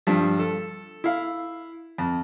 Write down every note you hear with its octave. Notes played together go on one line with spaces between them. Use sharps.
G2 F3
A4
E4 F5
F2